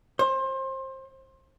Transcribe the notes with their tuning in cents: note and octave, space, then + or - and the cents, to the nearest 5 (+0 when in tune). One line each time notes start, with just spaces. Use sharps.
C5 +25